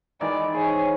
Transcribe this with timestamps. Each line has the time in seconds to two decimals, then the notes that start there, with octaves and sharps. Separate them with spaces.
0.21 D#3 E3 G#3 D5
0.54 G#4 C5 C#5